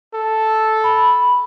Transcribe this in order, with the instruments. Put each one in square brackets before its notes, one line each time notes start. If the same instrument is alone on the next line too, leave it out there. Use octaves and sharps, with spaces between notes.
[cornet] A4
[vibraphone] B5